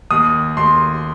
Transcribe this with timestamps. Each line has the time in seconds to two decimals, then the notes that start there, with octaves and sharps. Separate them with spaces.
0.11 D#2 D#6
0.57 D#2 C6